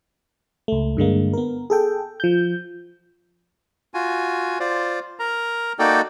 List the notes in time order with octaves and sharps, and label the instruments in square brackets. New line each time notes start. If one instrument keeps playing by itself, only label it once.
[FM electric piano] C#2 A3
G2 D3 G#3 A#3
B3 A#4
G#4 A4 G5
F3 G6
[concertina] F4 F#4 G#5
F4 C5 D5
A#4 A#5
A#3 D#4 F#4 A4 D5 G5